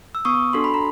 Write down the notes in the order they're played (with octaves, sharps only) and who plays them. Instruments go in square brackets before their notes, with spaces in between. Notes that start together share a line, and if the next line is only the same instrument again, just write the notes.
[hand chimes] E6
B3 C#6 D#6
D4 F#4 A4 C6
B5
A#5